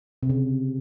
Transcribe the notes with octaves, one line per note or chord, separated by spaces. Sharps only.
C3
C#3